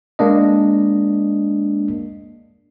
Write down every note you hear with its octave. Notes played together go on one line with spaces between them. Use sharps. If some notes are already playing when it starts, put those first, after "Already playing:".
G#3 A#3 D4 D#5